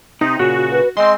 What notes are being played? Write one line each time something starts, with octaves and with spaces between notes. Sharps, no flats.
C3 D#4
A#2 C#3 F#4
B4
G#3 C4 D#5 C6